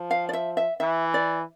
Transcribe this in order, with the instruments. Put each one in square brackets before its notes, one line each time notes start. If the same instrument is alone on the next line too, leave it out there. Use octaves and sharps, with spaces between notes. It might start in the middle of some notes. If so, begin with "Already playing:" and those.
Already playing: [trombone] F3
[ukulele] F5
D5
E5
E5
[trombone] E3 [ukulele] E5
[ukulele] D5